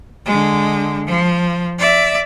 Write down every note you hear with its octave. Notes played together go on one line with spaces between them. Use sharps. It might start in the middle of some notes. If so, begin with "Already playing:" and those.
D3 G#3
F3
D5 E5